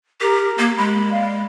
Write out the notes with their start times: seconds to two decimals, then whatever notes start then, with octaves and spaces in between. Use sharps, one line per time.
0.21 G4 A#4
0.58 A#3
0.78 G#3 B5
1.11 D5 F5